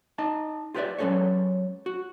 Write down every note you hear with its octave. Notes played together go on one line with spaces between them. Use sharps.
D#4 D#5 A5
F4 G4 B4 C#5 D5 E5
F#3 G#3 C#4 A4 B4 C#5
F#4